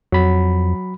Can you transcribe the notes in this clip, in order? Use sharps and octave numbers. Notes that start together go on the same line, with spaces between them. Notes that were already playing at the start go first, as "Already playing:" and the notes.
F2 F#3 B5